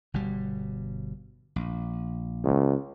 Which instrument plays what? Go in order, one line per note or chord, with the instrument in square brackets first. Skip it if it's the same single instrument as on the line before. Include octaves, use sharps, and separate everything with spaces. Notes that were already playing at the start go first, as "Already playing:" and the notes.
[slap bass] G1 B2 G3
A#1
[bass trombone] C#2